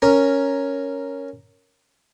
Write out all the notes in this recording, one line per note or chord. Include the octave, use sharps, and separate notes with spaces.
C#4 A#4